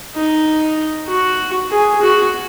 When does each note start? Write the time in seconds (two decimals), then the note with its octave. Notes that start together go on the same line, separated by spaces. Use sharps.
0.14 D#4
1.08 F#4
1.71 G#4
2.02 F#4